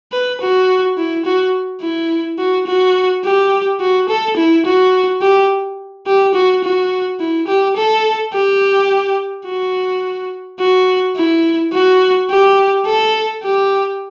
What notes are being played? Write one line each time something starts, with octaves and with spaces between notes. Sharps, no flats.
B4
F#4
E4
F#4
E4
F#4
F#4
G4
F#4
A4
E4
F#4
G4
G4
F#4
F#4
E4
G4
A4
G4
F#4
F#4
E4
F#4
G4
A4
G4